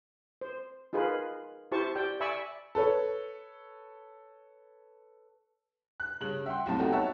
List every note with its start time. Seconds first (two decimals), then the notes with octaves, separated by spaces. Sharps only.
0.41 C5
0.93 D#4 F4 G#4 A#4 B4
1.72 E4 G4 C5 A5 C#6
1.95 G4 D5 G5
2.20 D5 E5 G#5 B5 C#6 E6
2.75 A4 B4 C#5
6.00 F#6
6.21 G2 C#3 F#7
6.46 E5 F#5 G5 C6
6.66 F#1 C2 A2 C4 E4 A5
6.80 B3 D#4 F#4 G4 A4
6.92 C#5 E5 F#5 A5